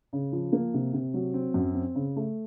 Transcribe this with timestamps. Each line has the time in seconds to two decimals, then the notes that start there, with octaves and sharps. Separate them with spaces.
0.13 C#3
0.33 F3
0.52 A#3
0.74 C3
0.94 C3
1.14 F#3
1.34 C4
1.54 F#2
1.75 C4
1.95 C#3
2.16 A3